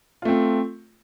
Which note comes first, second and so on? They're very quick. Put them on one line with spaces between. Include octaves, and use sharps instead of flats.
F4 A3 C4